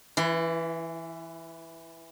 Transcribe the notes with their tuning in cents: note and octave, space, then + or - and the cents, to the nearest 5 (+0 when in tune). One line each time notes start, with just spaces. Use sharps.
E3 +0 E4 +40